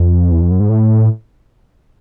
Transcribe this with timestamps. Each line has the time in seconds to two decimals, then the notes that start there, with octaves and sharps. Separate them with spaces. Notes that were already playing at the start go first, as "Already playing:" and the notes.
Already playing: F2
0.31 E2
0.41 F2
0.51 F#2
0.60 G#2
0.69 A2